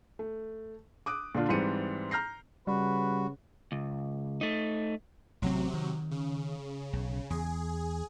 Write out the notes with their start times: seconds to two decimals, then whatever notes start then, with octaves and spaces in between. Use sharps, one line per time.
0.19 A3
1.06 D6 D#6 F#6 D7
1.35 A#2 D3 D4 F4
1.49 G#2 E3 G3 C4 C#7 D#7
2.11 A#5 F6 G6 A#6 C7
2.67 C#3 G3 F#4 B4
3.72 C#2
4.41 A3 D#4
5.42 A1 C3 F#3 C4
5.74 D#3
6.11 C#3
6.93 B1
7.30 E2 G#4